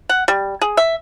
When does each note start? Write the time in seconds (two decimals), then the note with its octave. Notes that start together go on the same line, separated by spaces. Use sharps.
0.09 F#5
0.28 G3
0.61 G#4
0.77 E5